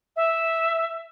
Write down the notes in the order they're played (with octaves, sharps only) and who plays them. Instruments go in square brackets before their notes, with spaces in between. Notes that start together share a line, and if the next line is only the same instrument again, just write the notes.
[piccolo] E5